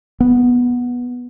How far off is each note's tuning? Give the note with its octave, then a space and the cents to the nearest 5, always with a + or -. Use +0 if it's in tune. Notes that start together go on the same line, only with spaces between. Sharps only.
B3 -10